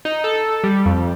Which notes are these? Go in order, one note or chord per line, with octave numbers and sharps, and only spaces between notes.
D#4
A4
G3
F2